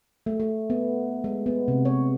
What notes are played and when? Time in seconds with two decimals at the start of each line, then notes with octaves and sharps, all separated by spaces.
0.26 A3
0.40 A3
0.70 B3
1.24 G#3
1.46 B3
1.68 C3
1.85 C#5